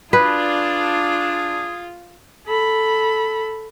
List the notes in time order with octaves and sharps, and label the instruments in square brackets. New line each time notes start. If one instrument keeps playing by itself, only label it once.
[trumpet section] D4 [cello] F4 [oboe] G#4 [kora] B4
[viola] A4 B5